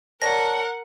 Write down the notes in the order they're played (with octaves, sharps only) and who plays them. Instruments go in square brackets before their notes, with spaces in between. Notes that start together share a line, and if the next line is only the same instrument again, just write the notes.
[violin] A#4 F#5 [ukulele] C#5 D5 A5 [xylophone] A#6